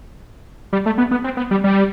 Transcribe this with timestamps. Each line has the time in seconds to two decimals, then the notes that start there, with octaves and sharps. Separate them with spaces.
0.73 G3
0.86 A3
0.98 B3
1.11 B3
1.24 C4
1.37 B3
1.51 G3
1.64 G3